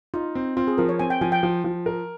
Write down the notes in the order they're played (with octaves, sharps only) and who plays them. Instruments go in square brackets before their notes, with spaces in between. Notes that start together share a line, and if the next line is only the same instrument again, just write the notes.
[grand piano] D#4 [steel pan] F4
[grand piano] C4
[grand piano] C4 [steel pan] F4
[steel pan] G#4
[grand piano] F3 [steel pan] A#4
[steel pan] C#5
[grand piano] C4 [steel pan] G#5
[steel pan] G5
[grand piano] F3 [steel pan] G#5
[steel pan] G5
[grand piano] F3
F3
A#4